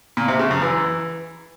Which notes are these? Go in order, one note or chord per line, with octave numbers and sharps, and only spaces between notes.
A#2
C3
C#3
F#2
E3